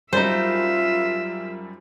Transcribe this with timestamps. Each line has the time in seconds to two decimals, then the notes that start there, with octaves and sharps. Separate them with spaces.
0.13 F#2 G3 D#4 F4 C5 E5